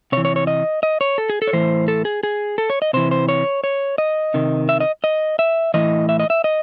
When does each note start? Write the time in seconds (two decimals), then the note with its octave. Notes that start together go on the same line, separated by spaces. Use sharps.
0.12 C3 C#5
0.17 E3
0.25 C#5
0.36 C#5
0.47 D#5
0.83 D#5
1.01 C#5
1.18 A4
1.30 G#4
1.42 A4
1.47 C#5
1.53 A2 E3 C5
1.88 A4
2.05 G#4
2.23 G#4
2.58 A4
2.70 C#5
2.82 D#5
2.93 C3 E3 C5
3.11 C5
3.29 C#5
3.64 C#5
3.98 D#5
4.34 C3 D#3
4.69 E5
4.80 D#5
5.04 D#5
5.39 E5
5.74 A2 E3 D#5
6.09 E5
6.20 D#5
6.30 E5
6.44 D#5